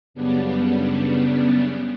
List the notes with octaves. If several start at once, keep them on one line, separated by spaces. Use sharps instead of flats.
F#2 C#3 G3 B3 D4